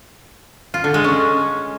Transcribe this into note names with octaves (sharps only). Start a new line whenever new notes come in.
F4
D3
G#3
C#4